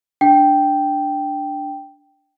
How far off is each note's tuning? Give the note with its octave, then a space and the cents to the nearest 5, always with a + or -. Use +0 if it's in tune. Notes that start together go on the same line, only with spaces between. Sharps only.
D4 +0 G5 -5